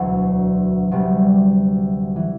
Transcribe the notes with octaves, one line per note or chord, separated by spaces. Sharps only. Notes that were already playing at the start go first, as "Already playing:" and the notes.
Already playing: E1 D2 D3 F#3
D2 C3 G3
E3